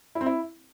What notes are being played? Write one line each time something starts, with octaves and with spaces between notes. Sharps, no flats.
E4
C4
E4